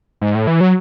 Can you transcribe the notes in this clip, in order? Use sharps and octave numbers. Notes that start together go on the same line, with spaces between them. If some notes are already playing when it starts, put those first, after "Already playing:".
G#2
A2
E3
F#3